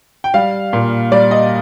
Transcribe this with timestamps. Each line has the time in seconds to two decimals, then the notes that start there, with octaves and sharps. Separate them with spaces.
0.24 G5
0.34 G3 F5
0.73 A#2
1.12 G3 D5
1.31 D#5